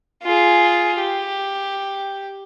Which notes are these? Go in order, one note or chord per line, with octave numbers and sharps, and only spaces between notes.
F4 G#4
G4